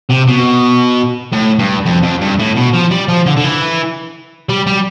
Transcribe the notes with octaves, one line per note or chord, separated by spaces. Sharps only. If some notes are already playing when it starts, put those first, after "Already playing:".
C3
B2
A2
G2
F2
F2
G2
A2
B2
F3
G3
F3
D3
D3
E3
G3
G3